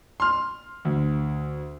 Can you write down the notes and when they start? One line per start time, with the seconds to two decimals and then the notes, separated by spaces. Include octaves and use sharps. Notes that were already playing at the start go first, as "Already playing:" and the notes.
0.20 C6 F6
0.85 D2